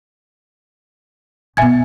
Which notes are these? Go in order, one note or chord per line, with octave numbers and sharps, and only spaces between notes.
B2 B3 E5 G#5 G#6